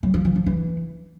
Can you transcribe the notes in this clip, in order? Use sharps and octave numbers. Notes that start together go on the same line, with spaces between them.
F#3
F3
F3
F3
E3